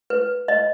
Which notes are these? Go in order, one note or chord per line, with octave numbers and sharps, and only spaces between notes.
B4
D#5